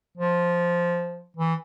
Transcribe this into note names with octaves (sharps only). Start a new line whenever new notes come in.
F3
E3